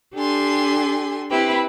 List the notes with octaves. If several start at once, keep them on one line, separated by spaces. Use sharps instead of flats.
D4 G4 A4 G#5 C6
C4 E4 G4 B4